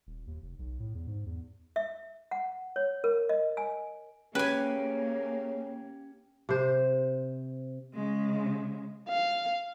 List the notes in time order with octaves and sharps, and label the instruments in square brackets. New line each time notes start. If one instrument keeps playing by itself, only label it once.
[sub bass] D#1
D#2
F1
B1
A2
E2
G#2
E2
[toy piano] E5
F#5
C#5
A#4
D#5
G#5
[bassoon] C#3 [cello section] A#3 [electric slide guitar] C#4 G4 [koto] B4 G#5
[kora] C3 C5
[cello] C#3 G#3
[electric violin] F5